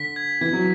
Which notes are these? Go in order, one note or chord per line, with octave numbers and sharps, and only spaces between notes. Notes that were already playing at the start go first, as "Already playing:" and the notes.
Already playing: D3 B6
G#6
E3 G#6
F#3